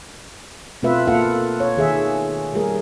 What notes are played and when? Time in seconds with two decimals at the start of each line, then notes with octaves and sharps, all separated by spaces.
0.83 B2 A3 C4 F4 B4 E5
1.07 A#3 F4 A4 F5 F#5
1.60 C#5
1.77 D#3 G#4 E5
2.54 G3 A3 G#4 A#4